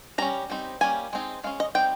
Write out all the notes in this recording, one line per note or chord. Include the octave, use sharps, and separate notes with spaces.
G3 C#4 A#5
G3 C4 D#4
G3 A#3 C#4 G#5
G#3 C4 D#4
G#3 C#4 F5
D#5
G3 C4 D#4 G5